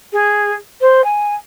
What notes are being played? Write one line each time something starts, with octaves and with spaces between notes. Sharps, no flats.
G#4
C5
G#5